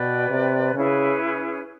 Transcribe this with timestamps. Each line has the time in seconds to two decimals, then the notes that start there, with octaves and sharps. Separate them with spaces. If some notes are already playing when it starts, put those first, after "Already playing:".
Already playing: B2 B4 D5 G5
0.30 C3
0.74 C#3 C#4 E4 G#4 B4